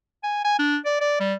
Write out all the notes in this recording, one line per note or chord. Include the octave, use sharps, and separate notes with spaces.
G#5
G#5
D4
D5
D5
G3